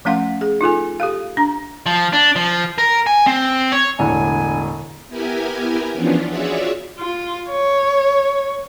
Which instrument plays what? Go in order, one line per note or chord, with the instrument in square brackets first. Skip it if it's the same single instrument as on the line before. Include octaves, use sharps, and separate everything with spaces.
[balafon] F3 A3 C#4 F5 F#5 C6
G#4
D#4 F4 A4 G#5
G4 A4 F5
D4 A#5
[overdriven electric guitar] F3
D4
F3
A#4
G#5
C4
C#5
[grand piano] E1 A2 D3 [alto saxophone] G#5
[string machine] B3 E4 G4 A#4 G#5
E3 F3 B3 C#4 D4 F4
F4 F#4 G#4 C#5 D5 E5
[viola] F4
C#5